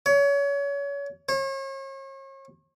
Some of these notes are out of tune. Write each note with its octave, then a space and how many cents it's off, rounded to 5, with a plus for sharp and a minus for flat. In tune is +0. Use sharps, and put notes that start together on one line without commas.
C#5 +30
C#5 -40